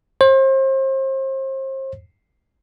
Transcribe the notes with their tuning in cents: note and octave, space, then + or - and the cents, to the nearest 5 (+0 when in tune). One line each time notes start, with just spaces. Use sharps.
C5 +35